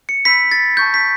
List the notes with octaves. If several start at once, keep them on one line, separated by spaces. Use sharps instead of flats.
C#7
B5 E6 G6 B6
A6
A5 C#6 G6
B6